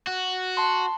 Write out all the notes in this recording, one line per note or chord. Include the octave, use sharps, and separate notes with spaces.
F#4
A5 C6